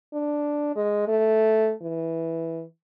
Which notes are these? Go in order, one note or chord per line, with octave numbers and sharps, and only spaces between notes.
D4
G#3
A3
E3